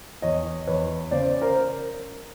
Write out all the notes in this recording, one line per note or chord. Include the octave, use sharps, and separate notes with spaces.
E2 C#5 D#5
E2 B4 C#5
C#3 C5 D5
A#4 C5